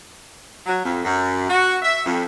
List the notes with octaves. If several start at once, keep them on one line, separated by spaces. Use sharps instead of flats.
F#3
F2
F#2
F#4
E5
F2